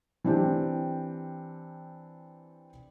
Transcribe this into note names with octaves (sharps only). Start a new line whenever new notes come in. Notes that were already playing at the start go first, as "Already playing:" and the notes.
E3 C4 D4 G4